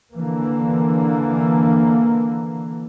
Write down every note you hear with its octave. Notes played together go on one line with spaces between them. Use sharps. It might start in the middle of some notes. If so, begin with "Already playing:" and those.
D3 E3 A#3